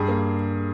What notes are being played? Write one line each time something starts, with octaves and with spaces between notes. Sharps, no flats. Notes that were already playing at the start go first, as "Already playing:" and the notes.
Already playing: G2 G#4
A#3